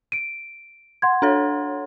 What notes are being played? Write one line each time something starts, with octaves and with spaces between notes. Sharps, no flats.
D7 D#7
F#5 C6 G#6
D4 A4 C#5